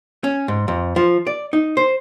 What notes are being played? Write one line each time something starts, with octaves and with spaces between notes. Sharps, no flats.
C#4
G#2
F2
F3
D5
D#4
C5